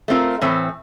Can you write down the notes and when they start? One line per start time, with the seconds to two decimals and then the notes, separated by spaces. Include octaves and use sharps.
0.08 A3 C4 F4 A#4
0.41 A2 E3 A3 C4